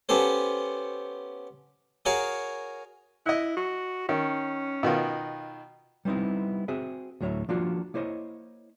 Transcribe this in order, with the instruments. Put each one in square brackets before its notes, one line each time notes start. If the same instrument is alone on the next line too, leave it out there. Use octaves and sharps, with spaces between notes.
[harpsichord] B3 C#4 G4 A4 C5
F#4 G#4 A#4 C#5 F5
[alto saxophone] E4 [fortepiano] D#5 F#6
[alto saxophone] F#4
[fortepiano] D#3 [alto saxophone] C#4
[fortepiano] B2 D#3 F4
[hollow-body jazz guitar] G3 B3 C4 D#4 E4
C4 F#4 G#4 E5
D2 A2 F#3 C#5 E5
F3 A#3 D4 F4 F#4
A#3 E4 C5 C#5 D#5